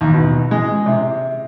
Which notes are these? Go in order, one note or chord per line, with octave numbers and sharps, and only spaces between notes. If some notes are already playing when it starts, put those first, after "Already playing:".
D#2
B2
G#3
C3